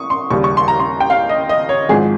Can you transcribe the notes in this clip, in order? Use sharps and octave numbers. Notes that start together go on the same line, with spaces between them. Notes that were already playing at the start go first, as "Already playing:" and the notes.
Already playing: C#6 D#6
C6
D#2 C#3 G3 C#6
C#6
C6
A#5
C6
G5
F5
D#5
D#5
C#5
G#1 G#2 F3 G#4